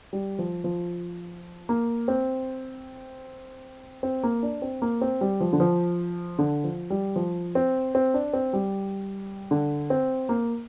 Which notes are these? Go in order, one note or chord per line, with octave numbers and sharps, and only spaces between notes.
G3
F3
F3
A#3
C4
C4
A#3
D4
C4
A#3
C4
G3
F3
D3
F3
D3
F3
G3
F3
C4
C4
D4
C4
G3
D3
C4
A#3